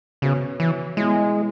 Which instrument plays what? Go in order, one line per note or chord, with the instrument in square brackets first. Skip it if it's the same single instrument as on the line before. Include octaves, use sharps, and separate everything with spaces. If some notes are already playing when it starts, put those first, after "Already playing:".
[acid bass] C#3 [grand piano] B3 F#4 C#5
[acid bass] E3
[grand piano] B2 B3 E4 [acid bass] G#3